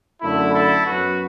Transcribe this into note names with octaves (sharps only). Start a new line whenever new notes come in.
F#2 D3 A3 E4
E4 A4
F#2 F#3 B3 F#4 B4